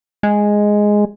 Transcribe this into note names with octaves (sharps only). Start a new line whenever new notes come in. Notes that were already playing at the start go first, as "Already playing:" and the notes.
G#3